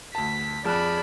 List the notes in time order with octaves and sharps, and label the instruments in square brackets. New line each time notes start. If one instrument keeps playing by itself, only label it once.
[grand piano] D2 A5 [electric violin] B6
[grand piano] F2 F#6 [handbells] G#4 A5 F6 [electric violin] D5 B5